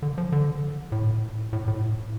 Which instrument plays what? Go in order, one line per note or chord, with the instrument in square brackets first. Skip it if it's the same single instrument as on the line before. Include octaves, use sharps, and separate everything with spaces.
[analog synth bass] D3
F3
D3
A2
A2
A2